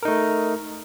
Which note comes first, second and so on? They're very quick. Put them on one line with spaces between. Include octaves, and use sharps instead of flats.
A#4 D#4 A3